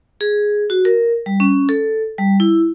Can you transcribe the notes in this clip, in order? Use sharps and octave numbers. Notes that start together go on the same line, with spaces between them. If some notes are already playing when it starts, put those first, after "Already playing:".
G#4
F#4
A#4
G3
C#4
A4
G3
E4